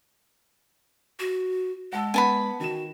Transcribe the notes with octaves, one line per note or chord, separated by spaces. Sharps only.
F#4
G#3 F#5 A5 E6
B3 F#5 G#5 A5 B5
D#3 F#4 E7